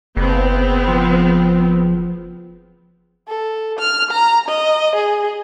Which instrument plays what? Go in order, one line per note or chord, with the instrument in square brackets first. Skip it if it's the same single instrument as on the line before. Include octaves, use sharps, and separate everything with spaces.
[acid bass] F#1 [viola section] B3 C4
[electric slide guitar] F3
[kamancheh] A4
F6
A#5
D#5
G#4